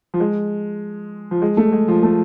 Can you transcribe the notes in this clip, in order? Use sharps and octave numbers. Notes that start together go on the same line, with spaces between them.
F3
G#3
F3
G#3
A3
G#3
F3
A3